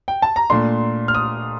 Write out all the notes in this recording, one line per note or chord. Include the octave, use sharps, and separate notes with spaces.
G5
A5
A#5
A#2 A3 D4 C6
F6
D#6